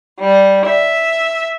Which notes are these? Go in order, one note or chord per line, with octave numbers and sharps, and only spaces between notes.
G3
E5